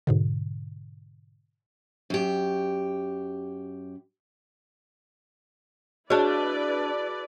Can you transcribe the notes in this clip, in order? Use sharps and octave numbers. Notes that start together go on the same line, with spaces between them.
G#2 B2 D3
F#2 G4
D4 E4 F#4 G#4 B4 C#5 D5 A5